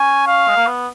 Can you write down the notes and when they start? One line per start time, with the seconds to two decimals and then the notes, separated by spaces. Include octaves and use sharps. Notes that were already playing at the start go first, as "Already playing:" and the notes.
Already playing: C#4 G#5
0.27 F5
0.48 G#3
0.57 A#3
0.67 B3